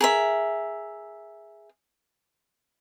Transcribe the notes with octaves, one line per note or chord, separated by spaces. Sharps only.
G#4 A#4 E5